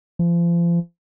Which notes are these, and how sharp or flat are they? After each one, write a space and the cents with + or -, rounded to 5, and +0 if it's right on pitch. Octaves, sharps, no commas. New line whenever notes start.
F3 -35